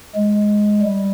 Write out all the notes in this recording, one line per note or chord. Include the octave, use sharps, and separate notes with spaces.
G#3
G3